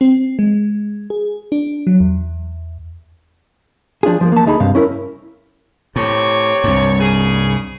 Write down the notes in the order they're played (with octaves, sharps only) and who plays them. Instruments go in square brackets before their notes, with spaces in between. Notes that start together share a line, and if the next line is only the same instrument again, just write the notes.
[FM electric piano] C4
G#3
G#4
D4
F#3
E2
[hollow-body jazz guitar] F3 D4 F4 G#4
F3 F#3 A#3
A#3 A5
D2 A3 D#4 G#4 B5
C#2 G2 C3 F5
C#4 E4 A#4
[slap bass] A2 [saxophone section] C3 C#5
[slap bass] C2 G2
[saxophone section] C#3 G#4